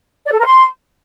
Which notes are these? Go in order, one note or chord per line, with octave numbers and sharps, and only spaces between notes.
D5
A4
A#4
C6